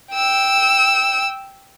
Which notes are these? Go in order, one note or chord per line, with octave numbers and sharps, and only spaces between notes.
G5 E6